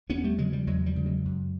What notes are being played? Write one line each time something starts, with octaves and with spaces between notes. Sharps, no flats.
E2 B3 C#4
G3 A3
C#3 F#3 G#3
F3 G3
E2 F#3 G#3
F3 G3
C#3
F#3 G#3
F#2